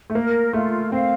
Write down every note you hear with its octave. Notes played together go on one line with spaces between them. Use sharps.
A3
A#3 A#4
A3 F4
C4 F5